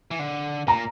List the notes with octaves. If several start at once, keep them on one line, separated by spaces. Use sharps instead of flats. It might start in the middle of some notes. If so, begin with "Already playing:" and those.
E3
D3
A#2 A#5